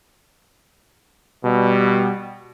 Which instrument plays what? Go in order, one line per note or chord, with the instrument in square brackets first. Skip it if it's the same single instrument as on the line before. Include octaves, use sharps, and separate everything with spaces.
[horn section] B2 G3